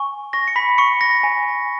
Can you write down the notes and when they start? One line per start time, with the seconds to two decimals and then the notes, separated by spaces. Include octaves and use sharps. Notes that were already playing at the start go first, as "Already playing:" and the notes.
Already playing: G#5 C#6
0.33 C#6 A#6
0.48 C#7
0.56 B5 B6
0.78 C#6 C#7
1.01 A#6
1.23 G#5